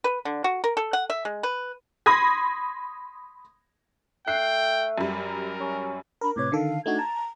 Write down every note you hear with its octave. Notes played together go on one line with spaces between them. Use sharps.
B4
D3
F#4
A#4
A4
F#5
E5
G#3
B4
B5 C6 D#6 G#6 A#6
A3 G5 F#6 C7
F#2 G3 A#4
C#4
D4 A#4 A#5 B5
A2 C3 B4 C#5 D6 G#6
D3 D#3 A4 F5
A3 D4 D#4 F#4 G#6
A5 A#5